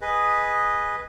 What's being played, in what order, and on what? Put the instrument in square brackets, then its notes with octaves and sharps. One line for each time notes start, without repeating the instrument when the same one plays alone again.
[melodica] G#4 B4 D#5